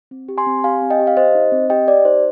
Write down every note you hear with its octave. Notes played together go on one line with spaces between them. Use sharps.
C4
G4
G#5 C6
C4
G4 F5 G#5
C4
D#5 G5
G4
F5
G4 C5 D#5
D#4
C4
G4 D#5 G5
G4 D5
D#4 C5